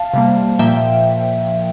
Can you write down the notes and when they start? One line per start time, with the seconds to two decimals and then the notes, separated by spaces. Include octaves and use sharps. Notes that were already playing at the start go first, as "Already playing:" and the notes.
Already playing: F5 A5
0.14 C3 G3 A#3
0.59 A#2 F3 A#3 E5 G5